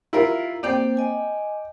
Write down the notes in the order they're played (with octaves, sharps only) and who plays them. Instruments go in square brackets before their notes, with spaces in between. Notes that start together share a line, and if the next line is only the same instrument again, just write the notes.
[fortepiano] E4 F4 A#4
[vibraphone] A#3 C4 C5 [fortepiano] D5 G5
[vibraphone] D#5 G#5